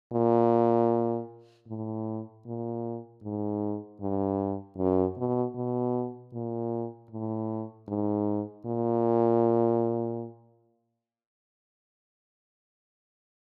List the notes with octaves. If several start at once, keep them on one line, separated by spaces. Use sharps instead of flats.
A#2
A2
A#2
G#2
G2
F#2
B2
B2
A#2
A2
G#2
A#2